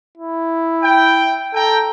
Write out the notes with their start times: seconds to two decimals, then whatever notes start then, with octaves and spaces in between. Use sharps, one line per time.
0.17 E4
0.82 G5
1.54 A4 G5 A#5